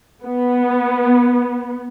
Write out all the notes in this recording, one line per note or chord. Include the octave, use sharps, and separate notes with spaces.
B3